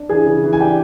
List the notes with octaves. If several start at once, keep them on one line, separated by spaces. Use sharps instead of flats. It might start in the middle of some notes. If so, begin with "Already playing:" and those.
Already playing: D4
E3 G#4 G#5
C#3
E3
G#5
D4 G4 G5